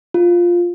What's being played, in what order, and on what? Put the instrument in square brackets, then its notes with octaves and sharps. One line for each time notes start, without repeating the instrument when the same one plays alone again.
[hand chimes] F4